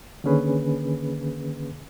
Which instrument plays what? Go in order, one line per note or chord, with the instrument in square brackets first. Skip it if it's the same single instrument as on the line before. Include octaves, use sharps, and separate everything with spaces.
[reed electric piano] D3 D#3 A#3 C#4 G#4 B4